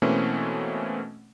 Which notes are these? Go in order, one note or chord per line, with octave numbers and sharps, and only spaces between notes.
B2 E3 A3 A#3 C4 C#4